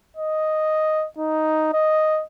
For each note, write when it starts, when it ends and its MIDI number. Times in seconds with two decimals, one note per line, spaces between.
0.17 1.06 75
1.19 1.69 63
1.73 2.23 75